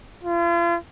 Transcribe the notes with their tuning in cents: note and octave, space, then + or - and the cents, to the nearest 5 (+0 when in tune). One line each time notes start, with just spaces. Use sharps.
F4 -40